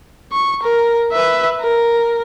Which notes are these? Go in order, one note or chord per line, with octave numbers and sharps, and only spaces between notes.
C#6
A#4
B4 E5
A#4